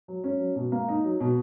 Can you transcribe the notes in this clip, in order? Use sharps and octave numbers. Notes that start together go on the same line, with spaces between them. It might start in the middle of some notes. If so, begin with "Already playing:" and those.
F#3
C#4
F#3
B2
A#3
D#4
F#3
B2